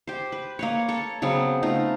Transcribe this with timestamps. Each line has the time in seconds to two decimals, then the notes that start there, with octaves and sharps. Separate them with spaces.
0.07 G4 C5
0.32 B4
0.59 A#3 B4 C#5
0.88 A4 C#5
1.22 C#3 F#3 B3 C4
1.63 A3 D#4 F4